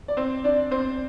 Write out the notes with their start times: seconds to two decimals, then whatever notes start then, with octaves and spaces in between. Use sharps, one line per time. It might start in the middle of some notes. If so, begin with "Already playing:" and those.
0.08 D5
0.17 C4 C5
0.44 D4 D5
0.71 C4 C5